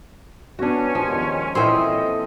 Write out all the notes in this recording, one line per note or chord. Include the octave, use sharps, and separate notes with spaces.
B3 C#4 D4 F#4
D#2 G#2 F3
A#2 E3 C4 A4 C5 D#5 E5 G5